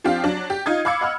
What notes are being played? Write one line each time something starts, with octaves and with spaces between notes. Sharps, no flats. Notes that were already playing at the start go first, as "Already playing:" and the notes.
F3 C4 D4 G4 F5
F#3 D4
G4
D#4 F4 D#6 G#6
F5 B5 D6 E6 G#6 C#7
D#5 F#5 B5 F6